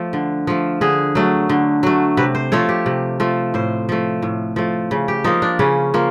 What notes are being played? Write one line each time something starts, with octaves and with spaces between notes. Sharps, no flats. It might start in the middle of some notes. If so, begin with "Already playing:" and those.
Already playing: F3 A3
D3
F3 A3
D3 G#4
F#3 A3
D3
F#3 A3
C3 B4
C5
F3 A3 C#5
G4
C3
F3 A3
A2 C5
F3 A3
A2
F3 A3
C#3
G4
F3 A#3 D#4
D4
C#3 C#4
F3 A#3